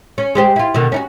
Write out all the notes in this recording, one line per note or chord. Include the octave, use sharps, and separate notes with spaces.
C#4
G#3 G4 C5
E4 F4
B2 D3 D#3
C#4 D#4 F#4